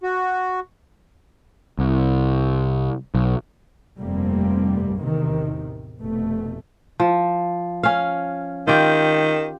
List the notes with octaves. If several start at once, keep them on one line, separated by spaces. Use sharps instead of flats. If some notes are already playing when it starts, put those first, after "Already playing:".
F#4
C2
B1
F1 G2 G3 A3 A#3 C4
A1 E2 C3 D#3
F1 B2 A3
F3
C#4 F5
D#3 F4 G4